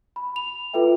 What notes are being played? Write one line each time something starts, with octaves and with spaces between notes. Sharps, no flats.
B5
F7
F4 A4 B4 E5 G5